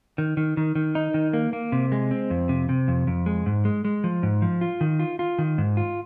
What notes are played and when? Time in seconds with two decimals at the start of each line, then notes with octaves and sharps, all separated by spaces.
0.18 D#3
0.37 D#3
0.57 D#3
0.75 D#3
0.95 D#4
1.14 D#3
1.33 A#3
1.53 A#3
1.72 C3
1.92 G#3
2.11 C4
2.30 F2
2.49 C3
2.69 C3
2.88 F2
3.07 F2
3.26 G#3
3.46 G#2
3.65 G#3
3.85 G#3
4.04 F3
4.23 G#2
4.42 F3
4.61 F4
4.81 D#3
4.99 F4
5.19 F4
5.39 D#3
5.58 G#2
5.77 F4